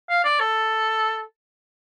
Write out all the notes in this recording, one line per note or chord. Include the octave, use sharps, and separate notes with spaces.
F5
D5
A4